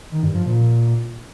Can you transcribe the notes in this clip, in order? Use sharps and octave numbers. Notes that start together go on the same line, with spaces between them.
D#3
G2
F3
A#2